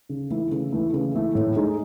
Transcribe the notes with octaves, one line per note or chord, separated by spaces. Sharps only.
C#3
E3 A3 E4
C#3
E3 A3 E4
C#3
E3 A3 E4
A2
G#3 D#4